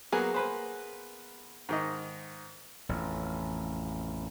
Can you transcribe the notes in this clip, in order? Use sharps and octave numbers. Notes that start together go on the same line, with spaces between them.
F#3 A#3 B3 G#4
A#3 B4 C5
G#2 D#3 D#5
A1 F2